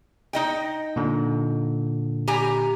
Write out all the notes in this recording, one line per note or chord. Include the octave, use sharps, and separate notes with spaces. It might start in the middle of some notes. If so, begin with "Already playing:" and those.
D#4 D#5 G5
A#2 D3
G4 G#5 A#5